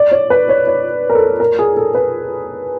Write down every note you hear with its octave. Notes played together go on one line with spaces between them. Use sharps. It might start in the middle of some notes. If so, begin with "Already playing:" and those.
Already playing: D5
C#5
B4
C#5
C#5
A#4
A4
A#4
G#4
A4
B4